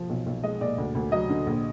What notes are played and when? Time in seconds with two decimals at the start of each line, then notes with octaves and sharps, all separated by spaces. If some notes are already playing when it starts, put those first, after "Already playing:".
Already playing: F3
0.09 B1
0.26 B1
0.43 G#3 D#5
0.61 A#2 D5
0.78 D2
0.95 D2
1.12 F#3 D#5
1.30 D3
1.47 A#1